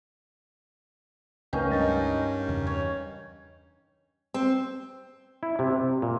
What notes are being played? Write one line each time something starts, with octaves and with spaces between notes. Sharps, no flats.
C#2 A3 C#4 D#4 A#4 B4 F5 G5
G2 A#4 D#5 A6
E2 C#3
C#5
C4
E4
C3
C3
A#2